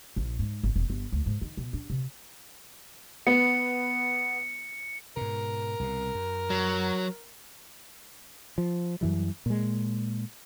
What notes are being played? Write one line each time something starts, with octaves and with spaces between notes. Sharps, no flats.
A#1
G#2
G#1
E1
G1
D2
G#2
D#3
B2
D4
C3
B3 C#7
G#2 B2 A#4
C2 B2
F#2
F#3
F3
F#2 E3 G3
A#2 G#3